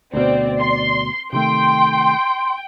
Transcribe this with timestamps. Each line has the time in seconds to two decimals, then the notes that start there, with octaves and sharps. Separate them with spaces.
0.13 D2 B2 C4 D5
0.60 C6
1.33 C3 D#3 A3 G5 C6